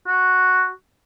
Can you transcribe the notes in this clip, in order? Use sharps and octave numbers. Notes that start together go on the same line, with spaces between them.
F#4